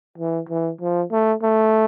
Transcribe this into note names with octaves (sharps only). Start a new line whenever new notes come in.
E3
E3
F3
A3
A3